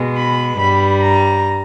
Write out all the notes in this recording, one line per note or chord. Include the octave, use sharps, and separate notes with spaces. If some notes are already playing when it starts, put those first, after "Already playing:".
Already playing: B2 G#3
B5
G2 G3 B5
A#5